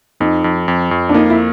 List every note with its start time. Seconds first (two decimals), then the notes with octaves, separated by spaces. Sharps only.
0.20 F2 D#4
0.44 F2
0.68 F2
0.91 F2
1.09 D4
1.14 A#3 D#4
1.30 E4